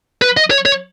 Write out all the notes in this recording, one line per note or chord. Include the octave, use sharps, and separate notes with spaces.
B4
D#5
C#5
C#5